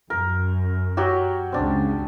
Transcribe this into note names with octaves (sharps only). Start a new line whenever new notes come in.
F#2 A#4
F#3 F#4 G4
C#2 C#3 C4 D4